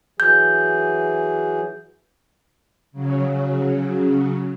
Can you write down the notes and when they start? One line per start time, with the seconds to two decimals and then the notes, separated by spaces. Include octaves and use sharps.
0.20 E3 F#3 G#4 G6
2.92 C#3 F#3